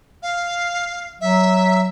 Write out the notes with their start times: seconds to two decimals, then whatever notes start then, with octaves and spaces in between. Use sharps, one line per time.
0.23 F5
1.21 F#3 E5